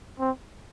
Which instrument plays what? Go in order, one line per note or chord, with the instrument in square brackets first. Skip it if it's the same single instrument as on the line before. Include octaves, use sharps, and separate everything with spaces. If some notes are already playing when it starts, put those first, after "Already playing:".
[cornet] C4